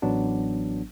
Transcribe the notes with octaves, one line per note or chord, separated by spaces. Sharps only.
A1 F#3 B3 D4